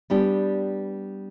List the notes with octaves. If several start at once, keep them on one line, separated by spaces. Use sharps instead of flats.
G3 B3 D4 G4